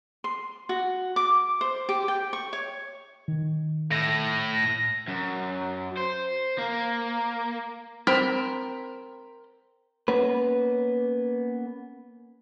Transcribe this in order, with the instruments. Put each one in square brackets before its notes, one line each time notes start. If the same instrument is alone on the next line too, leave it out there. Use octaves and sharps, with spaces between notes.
[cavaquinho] C6
F#4
D6
C5
G4
G5
C#6
C#5
[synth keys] D#3
[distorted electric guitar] A2 [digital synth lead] A#6
[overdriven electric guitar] F#2
C5
A#3
[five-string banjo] C4 A#4 B5
[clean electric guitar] A#3 B3 C#4 B4